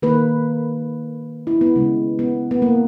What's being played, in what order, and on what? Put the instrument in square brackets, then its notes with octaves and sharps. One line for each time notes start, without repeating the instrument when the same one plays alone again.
[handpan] D#3 A#3 B4
E4
B3
C#3 G#3
B3
B3
A#3